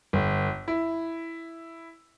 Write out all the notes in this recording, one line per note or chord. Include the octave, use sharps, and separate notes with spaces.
G1
E4